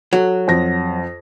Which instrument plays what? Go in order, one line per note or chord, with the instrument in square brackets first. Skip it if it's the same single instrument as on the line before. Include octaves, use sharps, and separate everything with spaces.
[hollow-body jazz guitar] F#3 [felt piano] F#4 A4
[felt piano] F2 A#6